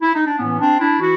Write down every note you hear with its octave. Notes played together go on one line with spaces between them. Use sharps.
E4
D#4
D4
A2 E3 B3 C#4
C4 D4
D4 E4
E3 E4 F#4